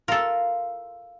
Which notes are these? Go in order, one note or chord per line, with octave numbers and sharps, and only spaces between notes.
F4 A4 A#4